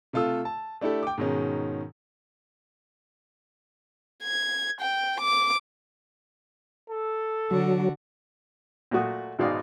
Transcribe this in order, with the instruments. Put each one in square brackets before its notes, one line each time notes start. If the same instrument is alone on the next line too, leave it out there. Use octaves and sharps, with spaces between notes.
[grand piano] C3 A3 F4 A4 E6
A5
A3 D4 E4 G4 A4
G5 D6
G#2 B2 D#3 G#3 C#4
[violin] G#6
G5
D6
[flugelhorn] A4
[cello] D3 F#4 [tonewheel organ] F#3
[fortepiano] A#2 F#3 A3 F#4 D#6
G#1 B2 G#3 D#4 D5 F5